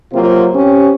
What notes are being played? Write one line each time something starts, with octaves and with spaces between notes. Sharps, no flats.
C3 F#3 A#3 C4 F4 C5
C4 C#4 G4